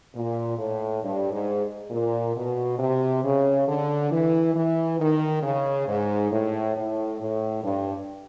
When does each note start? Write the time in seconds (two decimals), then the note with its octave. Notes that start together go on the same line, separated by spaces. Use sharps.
0.14 A#2
0.58 A2
1.02 G2
1.32 G#2
1.90 A#2
2.35 B2
2.79 C3
3.23 C#3
3.67 D3
4.11 E3
4.54 E3
4.98 D#3
5.43 C#3
5.88 G#2
6.31 A2
6.76 A2
7.20 A2
7.63 G2